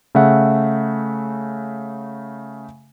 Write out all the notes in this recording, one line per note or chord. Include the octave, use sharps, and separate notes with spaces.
C#3 A3 E5 F#5